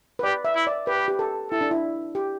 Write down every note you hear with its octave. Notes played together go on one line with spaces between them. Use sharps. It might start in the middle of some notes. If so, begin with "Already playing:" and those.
B4
G4 D5
E5
E4
D5
G4 B4
G4
A4
E4 A4
D4
E4
G4